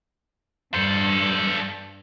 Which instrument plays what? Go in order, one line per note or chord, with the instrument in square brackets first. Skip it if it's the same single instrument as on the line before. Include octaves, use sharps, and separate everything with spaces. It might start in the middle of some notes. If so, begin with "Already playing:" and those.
[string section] G2 [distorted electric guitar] A4 C5